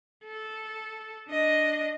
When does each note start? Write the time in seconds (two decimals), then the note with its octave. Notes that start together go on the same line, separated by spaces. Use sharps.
0.25 A4
1.29 D4 D#5